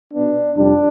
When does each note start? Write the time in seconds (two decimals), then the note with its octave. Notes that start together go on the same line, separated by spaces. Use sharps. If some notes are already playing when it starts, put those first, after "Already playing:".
0.13 B2 B3 D4
0.56 F2 C3 G3 D4